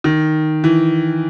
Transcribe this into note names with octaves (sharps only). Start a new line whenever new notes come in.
D#3
E3